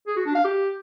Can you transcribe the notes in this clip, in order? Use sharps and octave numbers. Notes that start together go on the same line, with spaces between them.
G#4
F#4
D4
F5
G4